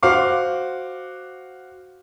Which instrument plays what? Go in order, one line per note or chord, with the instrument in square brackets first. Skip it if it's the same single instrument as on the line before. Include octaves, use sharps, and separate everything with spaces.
[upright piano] F#4 C5 F5 D6